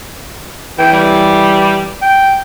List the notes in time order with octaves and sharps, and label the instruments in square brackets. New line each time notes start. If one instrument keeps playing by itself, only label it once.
[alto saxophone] E3 [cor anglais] G5
[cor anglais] G3
G5